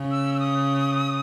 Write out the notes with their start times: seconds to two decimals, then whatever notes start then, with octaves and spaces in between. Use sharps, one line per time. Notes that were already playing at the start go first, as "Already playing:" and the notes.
Already playing: C#3
0.11 E6
0.34 E6
0.40 D#6